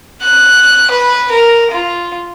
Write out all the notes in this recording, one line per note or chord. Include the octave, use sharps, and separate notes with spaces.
F#6
B4
A#4
F4